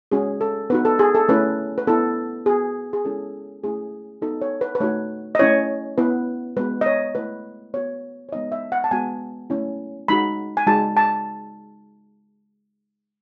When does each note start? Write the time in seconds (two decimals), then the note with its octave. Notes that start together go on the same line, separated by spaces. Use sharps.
0.11 G#3 C#4 F#4 G#4
0.41 A4
0.70 B3 D#4 F#4 B4
0.85 A4
0.99 G#4
1.15 A4
1.29 A3 C#4 E4 B4
1.78 B4
1.87 B3 E4 A4
2.46 B3 F#4 G#4
2.93 G#4
3.05 G#3 C#4 E4 A4
3.64 A3 C#4 E4 G#4
4.22 B3 D#4 F#4 A4
4.41 C#5
4.61 B4
4.75 B4
4.80 A3 D#4 F#4 C#5
5.35 D#5
5.39 A3 C#4 E4 C#5
5.98 B3 E4 B4
6.57 G#3 B3 F#4 B4
6.81 D#5
6.86 C#5
7.15 A3 E4 B4
7.74 B3 F#4 C#5
8.29 C#5
8.32 G#3 B3 D#4 D#5
8.52 E5
8.72 F#5
8.84 A5
8.91 G#3 B3 F#4 G#5
9.50 A3 C#4 E4
10.08 G#3 D#4 F#4 B5
10.57 G#5
10.67 G#3 D#4 F#4 A5
10.97 A5